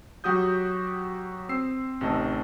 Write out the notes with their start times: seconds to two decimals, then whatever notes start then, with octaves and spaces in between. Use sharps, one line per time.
0.24 F#3 F#4 G4 D#6 G6
1.49 C4 E6 C7
2.01 A1 C3 D#3 D#5 A5 E6